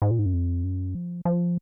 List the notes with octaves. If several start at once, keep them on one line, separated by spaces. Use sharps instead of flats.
G#2
A#2
G#2
F#2
F2
F#2
F3
F3